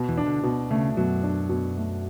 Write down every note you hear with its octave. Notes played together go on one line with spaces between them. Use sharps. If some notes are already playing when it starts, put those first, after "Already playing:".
Already playing: B2
E2 E3
D4
D3
B2
C#3 A3
F#2 B2 F#3
D4
B2
A3